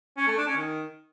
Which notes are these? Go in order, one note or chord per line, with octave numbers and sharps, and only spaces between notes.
C#4
A3
D4
C#4
D#3